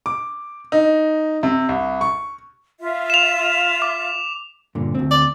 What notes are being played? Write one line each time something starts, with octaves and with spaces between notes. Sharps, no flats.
D6
D#4
C3
C2
C#6
F4 E5
E7 F7
D6
G2 A#2 D3
D2 C4
D5